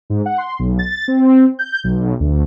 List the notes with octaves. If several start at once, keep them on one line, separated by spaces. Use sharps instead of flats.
G#2
F#5
C6
B1
A6
C4
G6
B1
D2